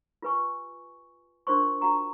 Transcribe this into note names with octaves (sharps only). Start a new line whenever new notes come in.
F4 G4 B4 G#5 C#6
D4 F4 A#4 C5 C6 C#6
F4 F#4 F#5 G5 A#5 C#6